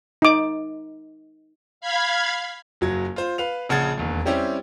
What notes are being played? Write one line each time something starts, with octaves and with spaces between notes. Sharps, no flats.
D#4 D6
F5 B5 G#6
F#1 F#3 G#6
F4 C5
B4 F5 F7
A#1 C#3 F#5 A5 G#6 A6
E1 D#2
G3 C4 C#4 E4 G4